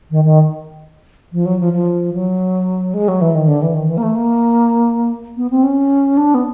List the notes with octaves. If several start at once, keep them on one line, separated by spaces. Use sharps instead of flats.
D#3
D#3
F3
F#3
F3
F3
F#3
G#3
F#3
E3
D#3
D3
E3
D#3
E3
A#3
A3
A#3
B3
C4
C#4
D4
B3